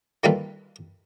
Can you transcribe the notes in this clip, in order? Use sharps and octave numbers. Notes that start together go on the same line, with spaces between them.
D#3 G3 A#3 F4 A4 B4